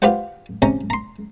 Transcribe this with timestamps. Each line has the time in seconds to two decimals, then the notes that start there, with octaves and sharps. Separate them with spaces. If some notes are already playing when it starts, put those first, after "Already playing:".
0.02 F4 G4 B4 C5 F#5
0.62 C3 C#4 A#5
0.90 A#5 C6